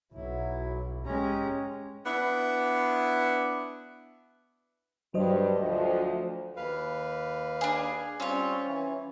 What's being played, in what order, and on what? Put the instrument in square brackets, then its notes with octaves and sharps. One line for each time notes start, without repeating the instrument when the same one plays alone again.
[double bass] B1 [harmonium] F#3 E4
[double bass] G#3 C#4 [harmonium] G4 A#5
[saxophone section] B3 D4 E4
[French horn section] G2 [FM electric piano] F#3 C5 D#5
[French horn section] D2 F3
[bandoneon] D#2 B4 F5
[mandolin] D4 G#4
[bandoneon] G3 C4 F4 [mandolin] C#4 C#5
[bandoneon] E3